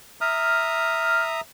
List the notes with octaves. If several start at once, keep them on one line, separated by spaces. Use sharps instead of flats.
E5 A#5 D#6 F6